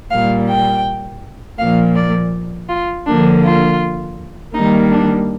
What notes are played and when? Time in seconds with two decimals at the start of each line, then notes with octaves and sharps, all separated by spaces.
0.11 A#2 G3 A#3 F5
0.49 G5
1.58 A#2 F3 A#3 F5
1.95 D5
2.69 F4
3.06 D3 F3 A#3 D4
3.44 F4
4.54 D#3 G3 A#3 D#4
4.92 D4